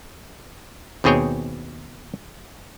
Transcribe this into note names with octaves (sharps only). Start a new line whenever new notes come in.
D#2 B2 C4 G#4 C#5 G5